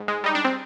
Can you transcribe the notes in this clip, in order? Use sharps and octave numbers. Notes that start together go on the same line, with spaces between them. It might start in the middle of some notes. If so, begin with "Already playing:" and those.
Already playing: G#2
G#3
G3 D#4
D4
C4